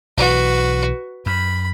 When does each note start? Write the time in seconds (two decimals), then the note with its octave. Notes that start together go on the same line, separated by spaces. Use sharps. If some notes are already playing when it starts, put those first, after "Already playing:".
0.17 B1 E3 F#4 B4
1.26 F#2 B5